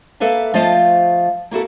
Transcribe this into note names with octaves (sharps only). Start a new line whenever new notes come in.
A#3 A4 B4 E5 F5
F3 A3 F4 C5 D#5 F5
A#3 E4 F#4 A4